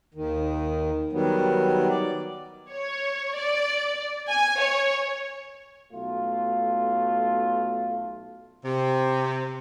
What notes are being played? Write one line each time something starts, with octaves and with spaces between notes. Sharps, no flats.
D#2 D#3
D#3 F#3 G3 B3
D5
C#5
D5
G#5
C#5
B1 A3 F4
C3